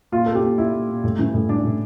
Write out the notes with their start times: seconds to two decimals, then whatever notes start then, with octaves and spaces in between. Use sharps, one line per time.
0.12 A#2 F4
0.26 A#2 A4
0.35 G4
0.43 A#2
0.58 A#2 E4
0.73 A#2
0.89 A#2
1.04 A2
1.19 E3
1.34 A2
1.49 E3 D4
1.64 A2